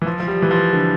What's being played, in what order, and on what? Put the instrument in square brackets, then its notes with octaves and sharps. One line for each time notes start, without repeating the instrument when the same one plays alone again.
[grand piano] E3
F3
F3
G3
E3
F3
D3